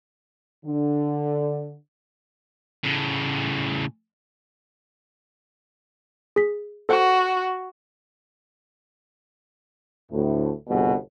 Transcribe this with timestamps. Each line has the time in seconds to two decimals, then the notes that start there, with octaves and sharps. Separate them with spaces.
0.65 D3
2.84 A2 C#3
6.36 G#4 B6
6.89 F#4 A4 C5 F#5
10.11 D2 A2
10.68 G1 C2 B2 G#4 F#5